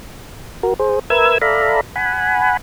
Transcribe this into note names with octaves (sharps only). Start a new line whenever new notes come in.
F#4 A#4
G#4 C5
A#4 B4 E5 E6 G#6
A4 D5 E5 F5 A#5 B5
F#5 G#5 B5